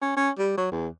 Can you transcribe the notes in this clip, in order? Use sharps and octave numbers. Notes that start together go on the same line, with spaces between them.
C#4
C#4
G3
F#3
E2